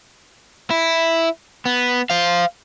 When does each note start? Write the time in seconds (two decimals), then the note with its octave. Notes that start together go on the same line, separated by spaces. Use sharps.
0.70 E4
1.65 B3
2.10 C5 F5